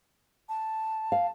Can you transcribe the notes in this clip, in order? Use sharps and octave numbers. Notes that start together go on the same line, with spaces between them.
A5
F5